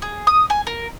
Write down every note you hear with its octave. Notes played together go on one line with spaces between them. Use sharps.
G#4
D#6
G#5
A#4